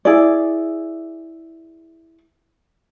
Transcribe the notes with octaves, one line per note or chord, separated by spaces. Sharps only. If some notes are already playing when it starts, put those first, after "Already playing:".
E4 G#4 D5